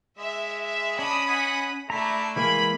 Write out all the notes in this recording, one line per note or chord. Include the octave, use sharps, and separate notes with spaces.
G#3 E5
E5
C#4 D4 D#5 B5 D#6
D#5 F#5 G#5
A3 D4 E4 A#5 B5
E3 G#3 A#3 G#5 B5